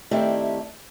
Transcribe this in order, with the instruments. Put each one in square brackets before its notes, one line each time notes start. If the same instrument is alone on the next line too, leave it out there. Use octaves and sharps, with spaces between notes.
[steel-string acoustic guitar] D#3 A3 C4 E4 G4 D5